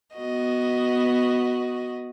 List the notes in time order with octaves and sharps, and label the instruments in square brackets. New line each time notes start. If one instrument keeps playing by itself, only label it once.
[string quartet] B3 F#4 D#5